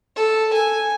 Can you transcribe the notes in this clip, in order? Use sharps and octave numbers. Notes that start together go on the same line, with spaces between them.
A4
G#5